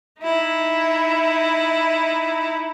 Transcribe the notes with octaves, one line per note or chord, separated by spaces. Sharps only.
D#4 E4